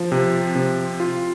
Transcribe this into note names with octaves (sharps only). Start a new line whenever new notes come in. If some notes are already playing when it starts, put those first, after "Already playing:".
Already playing: F3
C3
C3
F4